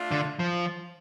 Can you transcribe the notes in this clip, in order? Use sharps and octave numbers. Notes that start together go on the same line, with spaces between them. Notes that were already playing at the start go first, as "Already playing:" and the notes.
Already playing: A3 D4 F4
D3
F3